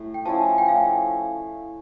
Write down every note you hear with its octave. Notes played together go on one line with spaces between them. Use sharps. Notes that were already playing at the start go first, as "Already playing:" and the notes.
Already playing: A2
G5
F3 C#4 E4 A5
G5
A2 F5